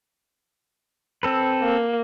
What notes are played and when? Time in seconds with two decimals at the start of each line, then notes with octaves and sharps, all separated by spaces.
1.23 C4 A4 B4
1.62 A#3